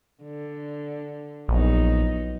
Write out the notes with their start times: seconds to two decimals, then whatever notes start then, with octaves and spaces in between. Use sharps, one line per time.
0.23 D3
1.48 A#1 F#3 B3 D#4